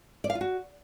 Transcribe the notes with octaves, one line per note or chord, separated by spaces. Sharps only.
D5
F5
F4
F#4